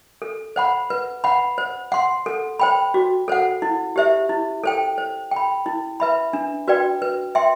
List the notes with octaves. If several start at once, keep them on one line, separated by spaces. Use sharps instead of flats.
A4
C5 F#5 B5
B4
F#5 B5
C5
F#5 C6
A4
C5 G5 B5
F#4
A4 C5 F#5
E4
G4 C5 E5
E4
A4 C5 G5
C5
G5
B5
E4
B4 E5 B5
D4
F#4 B4 D5 G5
B4
E5 G5 C6